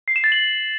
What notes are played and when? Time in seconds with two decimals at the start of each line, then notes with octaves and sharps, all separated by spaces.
0.08 C7
0.16 E7
0.24 A6
0.32 F#7